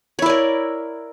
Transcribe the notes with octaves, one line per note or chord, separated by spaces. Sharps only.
E4 A#4 C#5 D5